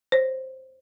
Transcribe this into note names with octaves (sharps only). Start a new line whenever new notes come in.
C5 C#5